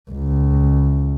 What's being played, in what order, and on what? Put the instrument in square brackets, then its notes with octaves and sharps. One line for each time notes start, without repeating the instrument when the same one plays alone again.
[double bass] C#2